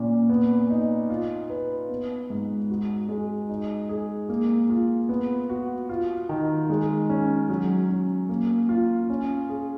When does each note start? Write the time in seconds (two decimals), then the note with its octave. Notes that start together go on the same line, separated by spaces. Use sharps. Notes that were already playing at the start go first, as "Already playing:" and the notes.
Already playing: A#2 C#4
0.29 B3
0.70 D#4
1.10 F4
1.50 B4
1.89 B3
2.30 G#2
2.70 F#4
3.09 G#3
3.49 D#4
3.89 G#4
4.29 A#3
4.70 F4
5.09 B3
5.49 F#4
5.89 F4
6.29 D#3
6.70 G#3
7.09 C#4
7.49 F#3
7.89 C#4
8.29 A#3
8.69 F4
9.10 C#4
9.49 G#4